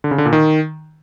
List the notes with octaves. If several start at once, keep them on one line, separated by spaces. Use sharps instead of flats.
D3
C#3
D3
A#2
D#3